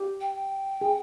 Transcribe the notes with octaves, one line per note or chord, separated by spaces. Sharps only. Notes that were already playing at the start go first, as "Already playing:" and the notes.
Already playing: G4
G5
G#4